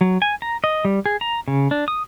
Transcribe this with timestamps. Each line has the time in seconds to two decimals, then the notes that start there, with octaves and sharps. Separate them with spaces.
0.01 F#3
0.22 G#5
0.42 A#5
0.64 D#5
0.85 G3
1.06 G#4
1.21 A#5
1.48 C#3
1.71 D4
1.88 D#6